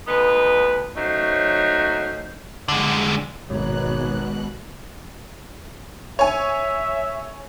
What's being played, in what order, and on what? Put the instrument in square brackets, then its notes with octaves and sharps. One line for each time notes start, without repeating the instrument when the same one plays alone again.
[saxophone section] D2 B3 D#4 B4
F#3 A3 C#4 D#4 C5
[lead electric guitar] D3 G#3
[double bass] G#1 G#2 [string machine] B2 F#6 [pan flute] C#5
[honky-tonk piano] C#5 G#5 [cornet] E5